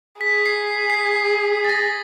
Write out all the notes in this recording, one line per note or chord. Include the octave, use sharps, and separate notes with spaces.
G#4 B6
C7
C7
B6
A6
A#6